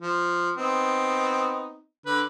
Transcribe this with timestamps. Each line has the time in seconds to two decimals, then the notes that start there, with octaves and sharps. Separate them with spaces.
0.01 F3
0.57 B3 C4 D#4
2.06 D3 B4